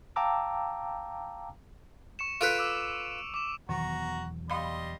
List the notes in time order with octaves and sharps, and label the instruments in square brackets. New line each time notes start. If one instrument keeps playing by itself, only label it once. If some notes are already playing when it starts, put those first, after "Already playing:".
[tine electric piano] F5 G5 A5 A#5 D6 E6
[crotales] C#6 C#7 E7
[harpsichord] F4 A4 B4 [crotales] D7 D#7 F7
[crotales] D6 E6
D6 E7
[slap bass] E2 B2 F#3 [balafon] D#3 [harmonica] F#4 A#5
[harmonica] G3 D#5 C6 [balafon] F5 B5